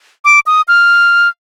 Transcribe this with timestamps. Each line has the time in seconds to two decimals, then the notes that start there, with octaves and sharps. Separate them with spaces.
0.25 D6
0.47 D#6
0.68 F6